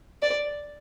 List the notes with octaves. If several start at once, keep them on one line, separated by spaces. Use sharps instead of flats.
D5